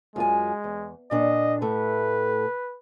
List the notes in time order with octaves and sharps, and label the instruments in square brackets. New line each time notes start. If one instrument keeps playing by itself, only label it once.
[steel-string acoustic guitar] F#2 F4 G#5 [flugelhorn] G#3
[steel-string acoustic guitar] E2
[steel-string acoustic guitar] A#2 D4 [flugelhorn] D#5
[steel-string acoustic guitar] A2 A3 [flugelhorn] B4